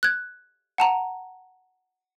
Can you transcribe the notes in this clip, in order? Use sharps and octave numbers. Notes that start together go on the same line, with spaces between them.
F#6 G#6
F#5 A5 A#5